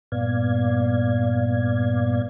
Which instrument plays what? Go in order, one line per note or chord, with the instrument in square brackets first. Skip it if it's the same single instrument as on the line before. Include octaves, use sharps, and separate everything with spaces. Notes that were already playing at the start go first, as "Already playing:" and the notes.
[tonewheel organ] G2 A#2 B3 D5 F5 G#6